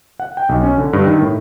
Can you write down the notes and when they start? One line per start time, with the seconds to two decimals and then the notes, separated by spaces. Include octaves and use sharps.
0.20 F#5
0.37 G5
0.49 B1
0.63 C#4
0.78 D3
0.93 G2
1.07 D#3
1.22 A2